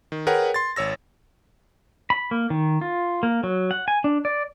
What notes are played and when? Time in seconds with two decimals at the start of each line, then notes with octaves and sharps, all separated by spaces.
0.12 D#3
0.27 G#4 A#4 B4 C#5 F#5 G5
0.54 C6 A6
0.76 G#1 C#5 E6 A#6
2.10 B5
2.31 A#3
2.50 D#3
2.81 F4
3.23 A#3
3.43 F#3
3.71 F#5
3.88 G#5
4.04 D4
4.25 D5